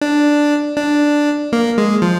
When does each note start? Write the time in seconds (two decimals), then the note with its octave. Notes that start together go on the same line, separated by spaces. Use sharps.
0.01 D4
0.77 D4
1.53 A#3
1.78 G#3
2.02 F3